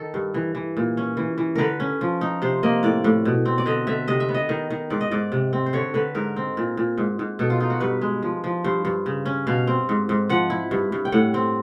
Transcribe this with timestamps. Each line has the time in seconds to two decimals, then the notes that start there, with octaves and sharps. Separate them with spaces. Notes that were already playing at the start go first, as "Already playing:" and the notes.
Already playing: D#3 A4
0.14 G2
0.34 E3
0.55 E3
0.77 A#2
0.97 C#4
1.17 E3
1.38 E3
1.56 D3 A#4 B4
1.80 C#4
2.01 F3
2.21 D#4
2.42 C3 C5
2.63 A#3 D#5
2.83 A2 D5
3.04 A2
3.25 B2
3.46 C4
3.58 D5
3.66 D3 D#5
3.87 D3 E5
4.08 C3 D#5
4.20 E5
4.29 B3
4.34 D#5
4.49 D#3
4.70 D#3
4.90 G#2 D5
5.01 D#5
5.11 G#2 D5
5.32 C3
5.53 C4
5.66 C5
5.73 D3 C#5
5.94 D3 B4
6.15 G#2 A#4
6.36 C4
6.57 A#2
6.77 A#2
6.98 G#2
7.19 G#2
7.39 B2 A4
7.50 F4
7.60 D#4 F4
7.70 F#4
7.80 G2 B4
8.01 G#3
8.22 F3
8.44 F3
8.64 G2 C5
8.85 G2
9.06 C#3
9.26 C#4
9.47 B2 F5
9.67 C4
9.89 G#2
10.09 G#2
10.30 F3 F#5
10.50 E4
10.71 G2
10.92 G2
11.05 G5
11.12 A2 F#5
11.34 C4